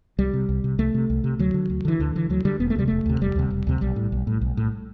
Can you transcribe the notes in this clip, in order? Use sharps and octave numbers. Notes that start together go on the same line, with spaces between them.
C2 G3
C3
C2
C3
C2 A3
C3
C2
C3
D2 F#3
D3
D2
D3 E3
D2 D3
D3 E3
D2 F#3
D3 G3
E1 B3
A3
D2 C3 G3
E1 A3
D2 C3
E1 G3
D2 C3
E1
D2 C3
B1 G3
A2
B1
A2
B1
A2